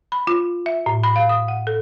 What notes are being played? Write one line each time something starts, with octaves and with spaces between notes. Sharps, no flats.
B5
F4
E5
A2
B5
F5
D#6
F#5
A4